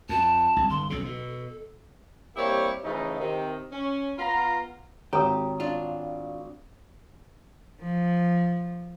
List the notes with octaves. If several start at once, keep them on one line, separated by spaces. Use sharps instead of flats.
F2 A5
C2
G1 C6
B1 C#3 A4
B2
G3 A#3 C4 E4 G4 C#5
C#3 E3 F3 A3 D#4
C3 D#3
C#4
B3 F4 A#5
G#1 G4 A4 C#5 A#5 D#6
D4 F4
F3